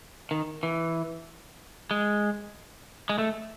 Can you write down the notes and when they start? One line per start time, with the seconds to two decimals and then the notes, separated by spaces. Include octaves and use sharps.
0.31 D#3
0.63 E3
1.91 G#3
3.09 G#3
3.18 A3